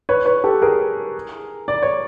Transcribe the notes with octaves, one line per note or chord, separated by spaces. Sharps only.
B4 C#5
B4 C#5
G4 A4
G#4 A#4
D5
C#5